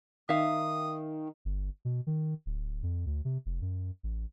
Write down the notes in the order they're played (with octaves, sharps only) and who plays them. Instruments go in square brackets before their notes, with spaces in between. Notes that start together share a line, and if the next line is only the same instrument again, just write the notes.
[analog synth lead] D#3 [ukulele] E5 F5 [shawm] D#6
[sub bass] G1
B2
D#3
D1
F2
D2
C3
F1
F#2
A1